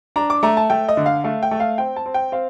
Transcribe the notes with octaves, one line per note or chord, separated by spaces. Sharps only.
D4 A#5
D6
A3 A#5
A5
A3 G5
D#5
D3
F5
A3 F5
G5
A3
F5
C4 G5
A5
C4
G5
C4 F5